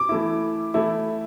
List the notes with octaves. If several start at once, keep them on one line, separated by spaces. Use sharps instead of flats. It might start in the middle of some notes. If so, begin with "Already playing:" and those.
Already playing: D6
E3 A3 E4
E3 A3 E4